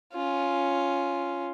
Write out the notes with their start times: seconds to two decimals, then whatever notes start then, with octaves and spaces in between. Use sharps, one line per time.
0.13 C#4 F4